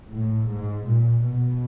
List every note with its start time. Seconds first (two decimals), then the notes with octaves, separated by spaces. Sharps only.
0.11 A2
0.48 G#2
0.86 A#2
1.23 B2